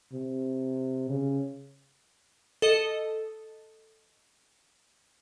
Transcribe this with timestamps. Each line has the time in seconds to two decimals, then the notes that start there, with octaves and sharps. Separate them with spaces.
0.13 C3
1.09 C#3
2.62 A4 D#5